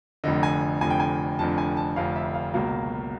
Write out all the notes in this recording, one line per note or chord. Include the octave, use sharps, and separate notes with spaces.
F1 F2 D3 D#5
G#5
F1 F2 D3 G#5
G5
G#5
F1 F2 D3 A5
G#5
A5
F1 F2 D3 F5
E5
F5
C#2 B2 F#3 A#3 F5